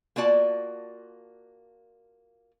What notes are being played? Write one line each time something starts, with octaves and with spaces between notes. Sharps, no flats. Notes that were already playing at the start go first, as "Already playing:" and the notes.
A#3 F4 F#4 D5 A5